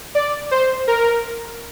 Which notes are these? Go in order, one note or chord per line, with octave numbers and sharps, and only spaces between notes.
D5
C5
A#4